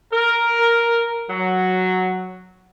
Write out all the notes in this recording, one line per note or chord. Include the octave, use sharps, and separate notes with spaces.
A#4
F#3